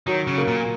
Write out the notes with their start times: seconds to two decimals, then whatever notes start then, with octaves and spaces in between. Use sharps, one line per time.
0.07 D#3 F#3
0.27 C#3
0.38 A#3
0.47 A#2